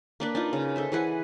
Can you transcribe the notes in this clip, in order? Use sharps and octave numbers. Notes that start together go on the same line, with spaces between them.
A#3 D4 B4
D4 D#4 F4
C#3
A4 C5 E5
E3 G#4 B4 F#5